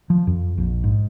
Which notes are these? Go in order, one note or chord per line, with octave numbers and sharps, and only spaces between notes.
F3
F2
A#1
G#2